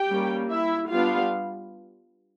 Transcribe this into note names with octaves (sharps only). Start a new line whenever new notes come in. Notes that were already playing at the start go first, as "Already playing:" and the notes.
Already playing: G4 G5
G3 A#3 C#4
E4 E5
G3 B3 D4 F4 F5